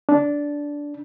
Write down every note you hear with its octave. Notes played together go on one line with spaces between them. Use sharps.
D4